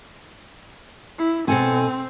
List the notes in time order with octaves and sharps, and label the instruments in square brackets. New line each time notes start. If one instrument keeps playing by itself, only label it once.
[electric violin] E4
[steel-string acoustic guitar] B2 A4 G#5 [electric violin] C4